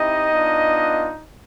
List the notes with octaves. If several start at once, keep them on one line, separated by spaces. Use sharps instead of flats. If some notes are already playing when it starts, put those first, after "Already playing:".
Already playing: C4 D#4 E4 G4 D#5
B3 D4 F4